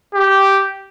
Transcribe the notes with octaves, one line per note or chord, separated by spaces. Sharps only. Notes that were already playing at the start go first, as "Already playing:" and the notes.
G4